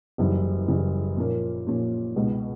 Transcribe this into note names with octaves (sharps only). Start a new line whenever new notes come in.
F#1 F#2 C#3 E3 G3
F#1 F#2 C#3 E3 G3
A#2 F3 A#3 C#4
A#2 F3 A#3 C#4
C#2 B2 G#3